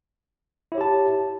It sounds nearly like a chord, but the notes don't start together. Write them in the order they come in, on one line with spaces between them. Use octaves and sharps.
E4 C#5 G4 A5